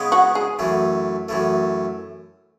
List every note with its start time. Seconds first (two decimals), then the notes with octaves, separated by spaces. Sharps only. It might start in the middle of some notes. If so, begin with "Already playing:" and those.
Already playing: C#3 G#3 B3 D#4
0.12 F#4
0.35 G#4
0.59 F#2 E3 A3
1.29 F#2 E3 A3